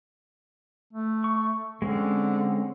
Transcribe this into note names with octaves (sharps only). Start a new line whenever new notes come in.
A3
C#6
D3 G#3 C4 C#4